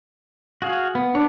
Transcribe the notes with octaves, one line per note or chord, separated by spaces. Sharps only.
F#4 G#4 F5
B3
B3 D4 C#5